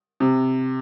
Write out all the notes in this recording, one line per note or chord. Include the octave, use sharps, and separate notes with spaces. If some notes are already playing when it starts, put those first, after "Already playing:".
C3